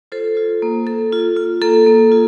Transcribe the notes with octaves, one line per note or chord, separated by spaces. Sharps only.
F4 A4 C5
F4
A#3
A#3 A4
F4
F4
A#3 A4
A#3
F4